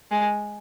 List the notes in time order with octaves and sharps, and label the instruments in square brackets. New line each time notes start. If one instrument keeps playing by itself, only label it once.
[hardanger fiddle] G#3